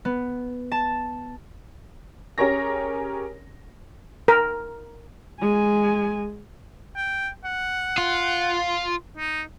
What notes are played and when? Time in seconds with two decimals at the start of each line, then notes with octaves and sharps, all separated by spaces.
0.05 B3
0.72 A5
2.38 C#4 G4 G#4 A#4 C#5 A#6
4.28 A#4
5.40 G#3 G#5
6.96 G5
7.44 F#5
7.98 F4
9.17 D#4